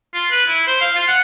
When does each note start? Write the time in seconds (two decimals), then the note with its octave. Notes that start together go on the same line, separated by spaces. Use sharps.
0.14 F4
0.31 B4
0.48 E4
0.67 C5
0.81 F5
0.96 F4
1.08 F#5